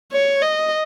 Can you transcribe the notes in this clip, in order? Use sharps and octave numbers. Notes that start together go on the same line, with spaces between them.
C#5
D#5